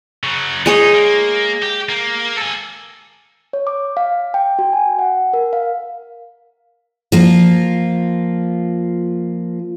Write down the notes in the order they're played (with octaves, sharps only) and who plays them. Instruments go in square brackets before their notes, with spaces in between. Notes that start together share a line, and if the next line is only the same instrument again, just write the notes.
[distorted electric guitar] C#3 F#3
[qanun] G#3 G#4 C#5 [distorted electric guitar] D#4
[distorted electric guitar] A#3
G4
A#3
A4 G#5
[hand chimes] C#5
D6
F5
G5
F#4
G#5
F#5
A#4
F5
[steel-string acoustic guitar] F3 A#3 F4